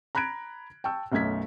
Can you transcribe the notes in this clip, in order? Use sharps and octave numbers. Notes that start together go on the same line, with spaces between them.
A#5 B5 F#6 G#6 D7
G5 A5 C#6 E6
B1 F#2 A3 G#6 B6